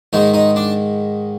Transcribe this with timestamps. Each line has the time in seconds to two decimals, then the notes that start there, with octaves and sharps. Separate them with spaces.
0.13 G#2 D#3 G#3 D#4
0.34 D#4
0.56 D4